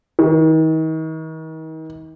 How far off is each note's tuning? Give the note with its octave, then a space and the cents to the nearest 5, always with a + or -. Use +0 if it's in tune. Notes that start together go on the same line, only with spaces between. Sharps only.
D#3 +40